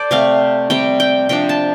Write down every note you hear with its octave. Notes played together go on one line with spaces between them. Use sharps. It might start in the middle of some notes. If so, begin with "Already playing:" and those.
Already playing: A4 C5 D5
C3 A3 C4 F5
C3 G3 C4 G5
G5
C3 F3 D4 G5
A5